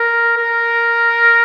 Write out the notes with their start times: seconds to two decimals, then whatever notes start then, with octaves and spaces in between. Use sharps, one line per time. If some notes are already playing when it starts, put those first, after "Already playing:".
Already playing: A#4
0.37 A#4